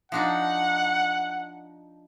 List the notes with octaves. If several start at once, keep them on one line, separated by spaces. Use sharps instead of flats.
F3 D4 D#4 F#5